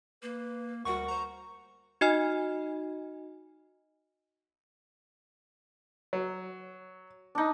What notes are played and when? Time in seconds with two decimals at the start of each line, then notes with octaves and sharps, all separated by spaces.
0.22 A#3 B4
0.85 D2 G3 F#4 A#4 F#5 C#6
1.08 C5 A#5
2.01 D#4 F#4 D#5 G#5 F6
6.13 F#3
7.35 D4 D#4